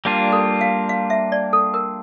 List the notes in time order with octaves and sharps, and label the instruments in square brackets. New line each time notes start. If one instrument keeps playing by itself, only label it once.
[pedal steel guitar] G3 A#3 D4 F4
[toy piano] A4
F5
F5
E5
D5
A4
A#4